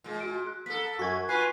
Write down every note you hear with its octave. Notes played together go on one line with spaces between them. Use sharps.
A#2 G#3
F#4 D7
F#6
A#3 A4 B6
F#2 F#4 G#6
F4 B4 G#5 C7